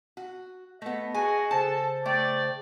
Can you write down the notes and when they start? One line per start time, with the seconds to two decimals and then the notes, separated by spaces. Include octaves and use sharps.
0.17 F#4
0.82 A3 B3 D#5
1.14 F#4 G#4 G#5
1.51 C#3 A4 C5 A5
2.06 A3 D5 G5